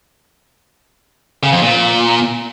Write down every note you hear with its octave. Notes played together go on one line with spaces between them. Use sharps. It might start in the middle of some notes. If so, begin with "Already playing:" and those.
C#3
F2
A#2